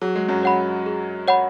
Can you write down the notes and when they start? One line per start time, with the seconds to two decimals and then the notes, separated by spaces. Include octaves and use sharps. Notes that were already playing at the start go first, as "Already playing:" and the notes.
0.01 F#3 G#4
0.15 G#3
0.29 F#2 F#3
0.43 C#5 F#5 B5
0.86 G#4
1.28 C#5 F#5 B5